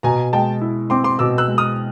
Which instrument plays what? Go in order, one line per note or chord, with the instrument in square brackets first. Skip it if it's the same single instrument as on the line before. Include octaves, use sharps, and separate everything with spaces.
[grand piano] B2 [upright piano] G#5 A#5
[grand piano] G#3 [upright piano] G5 A5
[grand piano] E4
[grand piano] C4 [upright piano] C6 D6
[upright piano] C6 D6
[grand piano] B2 [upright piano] D6 E6
[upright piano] E6 F#6
[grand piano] G#3
[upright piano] D#6 F6